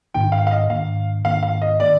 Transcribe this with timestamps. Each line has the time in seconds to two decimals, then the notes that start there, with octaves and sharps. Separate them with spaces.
0.14 G#2 D#3 A#3 D4 G5
0.32 F5
0.47 F5
0.51 D#5
0.69 G#2 D#3 A#3 D4 F5
1.25 G#2 D#3 A#3 D4 F5
1.43 F5
1.62 D#5
1.80 D#3 A#3 D4 D5